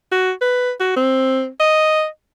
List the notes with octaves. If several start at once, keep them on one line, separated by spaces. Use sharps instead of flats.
F#4
B4
F#4
C4
D#5